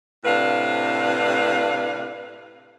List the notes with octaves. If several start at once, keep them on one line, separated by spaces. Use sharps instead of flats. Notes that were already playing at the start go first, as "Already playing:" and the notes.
A2 C3 D4 B4 F5